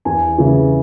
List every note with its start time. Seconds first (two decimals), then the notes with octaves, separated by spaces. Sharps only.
0.05 E2 G#5
0.38 C#3 E3